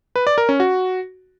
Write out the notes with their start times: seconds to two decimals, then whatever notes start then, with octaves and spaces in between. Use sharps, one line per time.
0.16 B4
0.27 D5
0.38 A#4
0.49 C#4
0.60 F#4